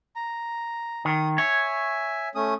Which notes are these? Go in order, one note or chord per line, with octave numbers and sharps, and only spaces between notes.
A#5
D#3 D#6
C#5 E5 G#5
A3 C#4 D#6